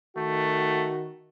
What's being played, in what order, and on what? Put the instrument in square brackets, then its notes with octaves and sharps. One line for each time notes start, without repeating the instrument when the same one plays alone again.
[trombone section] D#3 F#4 [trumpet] A3